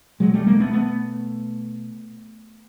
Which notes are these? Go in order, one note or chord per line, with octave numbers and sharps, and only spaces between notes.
B2 F#3 G#3
G3 A3
G#3 A#3
A3 B3
A3 B3